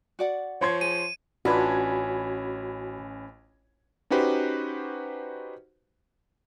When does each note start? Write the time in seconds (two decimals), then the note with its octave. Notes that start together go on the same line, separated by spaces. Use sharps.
0.19 F#4 D5 F#5
0.61 F3 C#5 C6 G#6
0.81 G#4 D#7
1.45 A1 C#4 D4 F4 F#4 B4 B5 G#6
4.10 C#4 D#4 F#4 G4 B4 C5